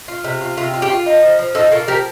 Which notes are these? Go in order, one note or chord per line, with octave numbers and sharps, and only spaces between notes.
F4
C3
F4
C3 F4
F4
G4
F4
D#4
F3
F3
D#4 F4 A4
A#3 F4 A4
F3 G4 A#4